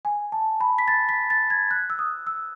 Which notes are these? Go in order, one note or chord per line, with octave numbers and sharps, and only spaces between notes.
G#5
A5
B5
B6
A6
B6
A6
G#6
F#6
E6
D#6
E6